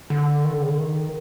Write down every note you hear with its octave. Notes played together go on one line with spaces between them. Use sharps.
D3
D#3
D3
C#3
D3
D#3